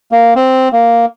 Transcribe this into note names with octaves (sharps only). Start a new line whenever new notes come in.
A#3
C4
A#3